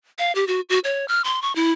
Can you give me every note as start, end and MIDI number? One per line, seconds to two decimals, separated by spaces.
0.19 0.32 77
0.35 0.45 67
0.48 0.61 66
0.69 0.79 66
0.84 1.05 73
1.08 1.22 89
1.24 1.42 84
1.42 1.54 85
1.56 1.72 64